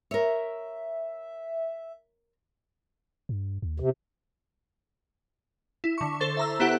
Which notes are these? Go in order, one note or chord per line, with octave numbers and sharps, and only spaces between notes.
A#4 C#5 E5
G2
D#2
C3
E4
D3 C#6
A4 C5 A6
E5 A#5 E6
B3 E4 G4 F#5